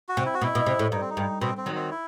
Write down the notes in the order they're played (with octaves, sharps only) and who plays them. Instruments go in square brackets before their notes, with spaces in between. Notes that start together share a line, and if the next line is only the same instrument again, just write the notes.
[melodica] F#4
[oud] C3
[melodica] E4
F#4
[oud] B2 [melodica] E4
[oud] B2
C3
A2
[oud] G2 [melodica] D#4
[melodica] C4
D#4
[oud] G2
[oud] B2 [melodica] C4
[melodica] C4
[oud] D#3 F#3
[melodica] C4
E4